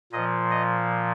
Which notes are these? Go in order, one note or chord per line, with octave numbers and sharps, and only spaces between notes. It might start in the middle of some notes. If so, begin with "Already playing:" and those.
A#2 F3 D#5
D#5